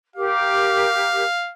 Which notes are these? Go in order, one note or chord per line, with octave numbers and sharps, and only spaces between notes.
G4 A#4 F5